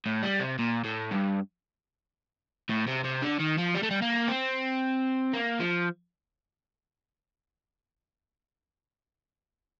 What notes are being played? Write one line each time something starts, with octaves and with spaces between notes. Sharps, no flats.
A2
G3
C3
A#2
A2
G2
A2
C3
C3
D3
D#3
F3
G3
A3
G3
A#3
C4
A#3
F3